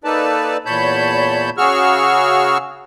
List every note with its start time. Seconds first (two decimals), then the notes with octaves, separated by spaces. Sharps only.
0.04 A#3 D#4 A4 B4 D5 A5
0.66 E2 A#2 C#5 A5 B5 G6
1.57 C#3 F#4 G#4 C#6 E6 F6